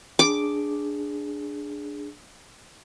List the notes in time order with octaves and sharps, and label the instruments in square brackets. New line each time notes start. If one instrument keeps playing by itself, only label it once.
[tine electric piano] D4 G#4 [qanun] D6